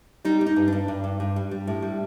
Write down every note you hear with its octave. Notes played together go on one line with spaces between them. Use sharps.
G3 D#4
G3
D#4
G2
G2 D4
G2
G2
G2
G3
G3
A2
G3